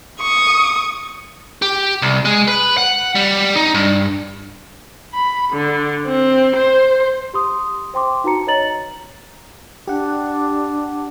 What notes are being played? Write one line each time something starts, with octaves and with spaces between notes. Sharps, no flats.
C#6 D#6
G4
C2
G#3
B4
F#5
G3
D#4
G2
B5
D3
C4
C5
G4 C6 D#6
C5 G5 C6 D6
D#4 F#4 B4 A5 A#5 C#7
B4 C#5 D#5 A#5 A6 F#7
D4 G4 F#5